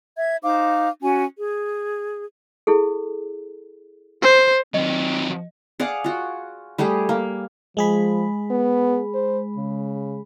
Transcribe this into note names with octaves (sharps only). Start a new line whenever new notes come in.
E5 G#6
D#4 C5 F5 D6
C#4 F#4 G#5
G#4
E4 G#4 A4
C5
D#3 F#3 C4 D#5
G#4 D5 F5 F#5
F4 F#4
G3 A3 G4 G#4
A#3
F3 G#3 G#4 B5
B3
C5
C#3